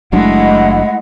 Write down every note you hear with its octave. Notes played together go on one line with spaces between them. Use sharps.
F#1 F#3 G#3 A3 D4 E4 D#5 F#5